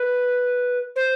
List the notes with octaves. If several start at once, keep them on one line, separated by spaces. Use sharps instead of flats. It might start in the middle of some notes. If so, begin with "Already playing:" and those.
Already playing: B4
C5